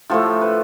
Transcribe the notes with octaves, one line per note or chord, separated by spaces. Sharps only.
A2 F3 A3 A4
A4
B4